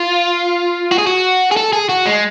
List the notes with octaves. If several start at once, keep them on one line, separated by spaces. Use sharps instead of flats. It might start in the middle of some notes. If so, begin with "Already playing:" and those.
Already playing: F4
F#4
G#4
F#4
G#4
A4
G#4
F#4
G#3